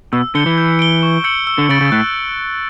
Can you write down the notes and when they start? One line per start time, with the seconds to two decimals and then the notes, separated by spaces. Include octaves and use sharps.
0.13 B2 E6
0.35 D3 G6 C#7 G7
0.46 E3
0.58 G6
0.79 D7 G7
1.03 C#6
1.24 E6 G6 C#7 F#7
1.47 E6
1.58 D3
1.69 C#3 A6 D7 F#7
1.81 C#3
1.92 A2 F#6